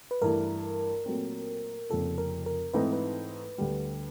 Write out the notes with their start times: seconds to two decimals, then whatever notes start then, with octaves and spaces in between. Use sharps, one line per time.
0.11 B4
0.22 G2 E3 A3 A#4
1.06 A#2 F#3 A3 C4
1.90 F1 F2 C#3 F3 A#3 A4
2.18 A#4
2.46 A#4
2.73 G#2 E3 A3 C4 D#4 B4
2.93 B4
3.58 D2 D3 G3